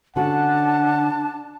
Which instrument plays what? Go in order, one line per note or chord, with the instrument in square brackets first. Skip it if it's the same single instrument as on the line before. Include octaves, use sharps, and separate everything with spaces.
[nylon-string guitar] D3 C#4 F#4 [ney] D4 [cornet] F#5 [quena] A5